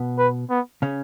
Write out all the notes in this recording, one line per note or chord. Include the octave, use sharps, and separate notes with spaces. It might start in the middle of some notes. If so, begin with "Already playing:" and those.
Already playing: B2 B3
B4
B3
C#3 C#4